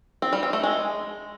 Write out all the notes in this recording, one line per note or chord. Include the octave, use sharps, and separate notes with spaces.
C4
G3
C4
A3
G#3